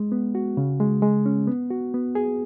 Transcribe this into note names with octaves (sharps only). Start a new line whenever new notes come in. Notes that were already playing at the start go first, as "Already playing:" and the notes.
Already playing: G#3
B3
F#4
C#3
G#3
G#3
C#4
B3
F#4
B3
G#4